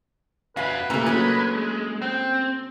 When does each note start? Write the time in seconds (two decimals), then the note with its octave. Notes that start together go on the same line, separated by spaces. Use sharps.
0.57 F#4 B4 E5 F5 G#5
0.90 A#2 C#3 A3 A#3 G4 A#5
1.06 F#3 G#3 A#3 D4
2.02 C4 G5